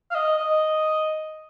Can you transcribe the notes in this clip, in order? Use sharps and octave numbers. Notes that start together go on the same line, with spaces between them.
F5
D#5
D#5